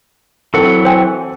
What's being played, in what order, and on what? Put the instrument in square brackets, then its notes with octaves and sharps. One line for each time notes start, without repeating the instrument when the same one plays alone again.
[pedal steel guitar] E3 F#3 F#5 [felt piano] C4 A4
[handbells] C5 G5 G#5